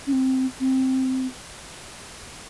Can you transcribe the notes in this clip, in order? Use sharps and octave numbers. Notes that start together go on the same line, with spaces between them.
C#4
C4
C4